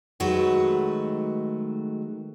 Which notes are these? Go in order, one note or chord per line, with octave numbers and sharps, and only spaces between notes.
D#3 F#3 G#3 A3 F#4 B4